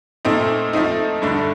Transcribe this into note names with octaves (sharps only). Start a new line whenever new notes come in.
A#2 A3 C4 D#4
F3 A3 C4 D#4
G2 D3 A3 D4